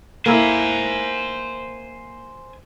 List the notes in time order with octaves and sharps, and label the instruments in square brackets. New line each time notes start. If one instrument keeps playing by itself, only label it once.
[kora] A#3 E4 [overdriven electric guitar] C5 G#5